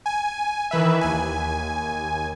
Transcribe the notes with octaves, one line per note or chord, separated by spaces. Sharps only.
G#5
D#3 E3 B4 E5
D#2 G#5